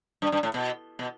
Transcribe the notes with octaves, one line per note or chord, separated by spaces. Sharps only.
G2
G2
A2
B2
B2